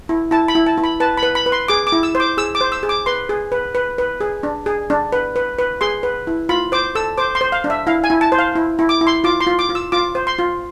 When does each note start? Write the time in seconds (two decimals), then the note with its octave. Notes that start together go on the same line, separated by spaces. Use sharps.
0.09 E4
0.31 E4 A5
0.48 B5
0.55 E4
0.66 A5
0.78 E4
0.84 B5
1.00 B4 A5
1.17 B5
1.23 B4
1.35 B5
1.46 B4
1.52 C6
1.68 G#4 D6
1.87 D6
1.92 E4
2.03 E6
2.15 C5
2.20 D6
2.37 G#4 E6
2.55 D6
2.61 C5
2.72 E6
2.83 G#4
2.89 D6
3.06 B4 C6
3.29 G#4
3.52 B4
3.75 B4
3.98 B4
4.20 G#4
4.43 D4
4.66 G#4
4.90 D4
5.12 B4
5.36 B4
5.59 B4
5.81 G#4 C6
6.03 B4
6.27 E4
6.49 F4 B5
6.72 C5 D6
6.95 A4 E6
7.17 C5 D6
7.35 C6
7.41 C5
7.52 F5
7.64 D4
7.70 E5
7.87 E4 F5
8.04 G#5
8.10 E4
8.21 A5
8.32 C5
8.39 F5
8.56 E4
8.79 E4
8.89 D6
9.01 E4
9.07 C6
9.24 F4 D6
9.41 C6
9.47 F4
9.59 D6
9.69 F4
9.75 E6
9.92 F4 D6
10.15 C5
10.27 C6
10.38 F4